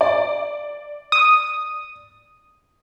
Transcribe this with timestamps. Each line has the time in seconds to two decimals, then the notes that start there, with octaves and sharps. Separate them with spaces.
0.01 D5
1.12 D#6